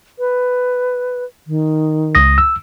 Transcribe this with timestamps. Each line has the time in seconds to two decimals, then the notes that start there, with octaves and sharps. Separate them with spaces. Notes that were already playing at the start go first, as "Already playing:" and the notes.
0.19 B4
1.47 D#3
2.15 C#2 D#6 A#6
2.38 E6